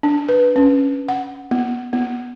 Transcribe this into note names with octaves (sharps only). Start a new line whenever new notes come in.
D4
B4
C#4
F#5
B3
B3